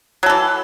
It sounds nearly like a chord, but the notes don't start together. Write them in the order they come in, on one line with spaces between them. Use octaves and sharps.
F#3 A4 E3